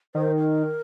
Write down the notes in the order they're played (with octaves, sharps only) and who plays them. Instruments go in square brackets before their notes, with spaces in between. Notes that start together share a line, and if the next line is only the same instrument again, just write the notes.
[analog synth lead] D#3 [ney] C5
[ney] A#4